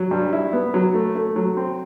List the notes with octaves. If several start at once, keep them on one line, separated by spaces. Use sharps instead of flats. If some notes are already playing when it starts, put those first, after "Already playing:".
Already playing: F#3
G2
E4
B3
F#3
A3
A3
F#3
C4